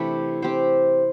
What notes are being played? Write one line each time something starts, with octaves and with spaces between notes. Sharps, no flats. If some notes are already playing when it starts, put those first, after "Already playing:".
Already playing: C3 E3 A3 D4 E4 G4
C4 G4 C5